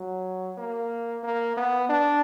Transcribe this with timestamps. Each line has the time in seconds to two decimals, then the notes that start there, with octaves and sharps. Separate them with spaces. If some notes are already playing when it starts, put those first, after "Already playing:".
Already playing: F#3
0.58 A#3
1.24 A#3
1.57 B3
1.89 D4